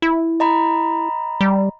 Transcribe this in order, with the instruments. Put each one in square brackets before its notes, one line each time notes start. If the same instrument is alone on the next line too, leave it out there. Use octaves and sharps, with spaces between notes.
[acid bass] E4
[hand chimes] D#5 A#5 B5
[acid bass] G3